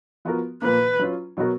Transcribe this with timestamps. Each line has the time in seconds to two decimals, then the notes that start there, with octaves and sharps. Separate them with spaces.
0.25 F3 B3 F#4 A#4
0.62 A#2 F3 A#3 B4
0.99 F#3 C#4 F4
1.37 B2 F#3 B3 F#4 A#4